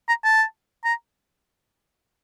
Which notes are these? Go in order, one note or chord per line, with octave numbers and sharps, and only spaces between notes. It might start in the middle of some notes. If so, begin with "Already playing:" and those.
A#5
A5
A#5